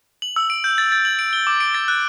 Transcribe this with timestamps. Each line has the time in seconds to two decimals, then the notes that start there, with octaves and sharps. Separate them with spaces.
0.22 F#7
0.36 E6
0.50 D7
0.64 G6
0.78 A6
0.92 A6
1.05 F#7
1.19 D7
1.33 G7
1.47 D6
1.60 D7
1.74 A6
1.88 F#6